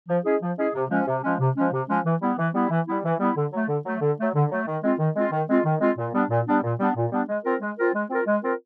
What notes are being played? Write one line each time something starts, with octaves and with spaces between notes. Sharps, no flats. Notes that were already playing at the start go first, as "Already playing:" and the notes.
F3
G#3 C#4 E4 G#4
F3
G#3 C#4 E4 G#4
C3
F3 G#3 C#4
C3
F3 G#3 C#4
C3
F3 G#3 C#4
C3
F3 G#3 C#4
E3
G3 B3 E4
E3
G3 B3 E4
E3
G3 B3 E4
E3
G3 B3 E4
D3
F#3 A3
D3
F#3 A3
D3
F#3 A3
D3
F#3 A3
D#3
G#3 C4 F4
D#3
G#3 C4 F4
D#3
G#3 C4 F4
D#3
G#3 C4 F4
A#2
G3 B3 D4
A#2
G3 B3 D4
A#2
G3 B3 D4
A#2
G3 B3 D4
G#3
C4 F4 A#4
G#3
C4 F4 A#4
G#3
C4 F4 A#4
G#3
C4 F4 A#4